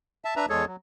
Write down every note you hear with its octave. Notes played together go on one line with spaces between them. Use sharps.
E5 A5
D4 B4 E5 A#5
E2 G#3 G#4 A4 C#5
F#3